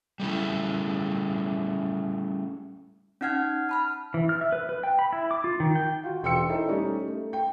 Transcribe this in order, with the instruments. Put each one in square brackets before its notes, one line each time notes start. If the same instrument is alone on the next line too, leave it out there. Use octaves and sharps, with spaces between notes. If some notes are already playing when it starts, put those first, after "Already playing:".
[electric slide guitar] G3 A3 C#4 E4
[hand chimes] C#4 D#4 F#5 F6 G#6
A5 B5 F6
[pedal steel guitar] E3
F6
E5
B4
B4
G5
B5
E4
D6
F4
D#3
G5
[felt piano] F4 F#4
E1 G5 C6 E6 C#7
D#4 E4 A4 C5 D#5
G3 A3 C#4 D#4 G4 D5
A3
G5